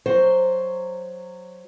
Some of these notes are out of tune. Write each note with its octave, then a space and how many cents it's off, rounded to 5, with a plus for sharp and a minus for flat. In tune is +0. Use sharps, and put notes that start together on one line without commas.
F#3 +0 C5 +0